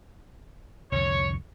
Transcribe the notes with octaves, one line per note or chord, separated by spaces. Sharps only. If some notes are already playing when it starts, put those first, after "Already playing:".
C2 F2 D3 C#5